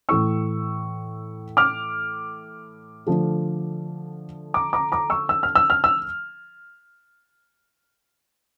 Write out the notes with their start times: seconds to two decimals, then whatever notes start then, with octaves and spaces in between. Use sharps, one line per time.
0.09 A2 E3 A3 E4 C#6 E6
1.57 D6 F6
3.07 D3 F3 A3
4.54 A#5 D6
4.73 A#5 D6
4.92 A#5 D6
5.10 C#6 E6
5.29 E6
5.43 F6
5.55 E6
5.70 F6
5.84 E6